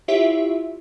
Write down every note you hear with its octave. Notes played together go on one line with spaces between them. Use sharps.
E4 F4 G4 C#5 E5